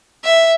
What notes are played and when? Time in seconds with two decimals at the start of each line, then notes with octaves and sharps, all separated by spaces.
0.24 E5